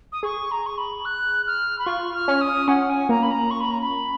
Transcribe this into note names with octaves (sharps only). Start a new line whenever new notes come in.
D#6
G#4 C#6
A#5
C#6
B5
F#6
F6
B5
F4 C#6
F6
C#4
D#6
C#4 F#5
G#5
A#3 A#5
B5
A#5
C#6
B5
A#5
B5